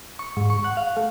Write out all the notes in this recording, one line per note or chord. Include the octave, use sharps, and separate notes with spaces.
C#6
G#2
C#6
F#5
F5
A3